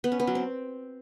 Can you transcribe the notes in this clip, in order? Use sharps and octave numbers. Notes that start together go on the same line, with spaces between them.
B3
C#4
B3
F#3
C4